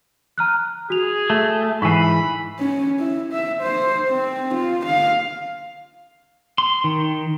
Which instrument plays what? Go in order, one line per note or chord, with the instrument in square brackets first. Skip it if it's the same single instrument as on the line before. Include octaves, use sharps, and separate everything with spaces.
[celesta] A#5 F6 F#6
[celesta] F#4 F7 [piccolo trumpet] G#4
[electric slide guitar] A3
[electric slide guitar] G#2 E3 [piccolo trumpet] B5 [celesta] C#6 C7
[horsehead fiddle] C#4
E4
E5
C5
C4
F4
F5
[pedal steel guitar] C6
D#3